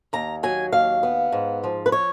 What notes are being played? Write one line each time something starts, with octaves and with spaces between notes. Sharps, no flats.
D#2 A#5
F#3 G#5
D#2 F5
B3
G#2
F3
B4
C#5